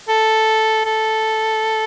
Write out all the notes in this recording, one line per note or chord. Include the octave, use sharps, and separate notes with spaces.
A4
A4